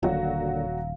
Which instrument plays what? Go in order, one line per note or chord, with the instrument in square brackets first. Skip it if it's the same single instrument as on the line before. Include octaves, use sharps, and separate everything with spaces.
[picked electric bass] D#1 [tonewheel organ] A#2 D3 [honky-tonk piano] F#3 F#4 [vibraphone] F5